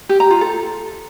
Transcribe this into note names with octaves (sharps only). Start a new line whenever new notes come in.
G4
A#5
F4
A4